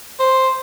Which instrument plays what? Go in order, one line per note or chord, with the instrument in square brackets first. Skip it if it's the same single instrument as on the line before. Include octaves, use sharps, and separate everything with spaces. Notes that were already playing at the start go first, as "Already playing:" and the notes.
[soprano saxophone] C5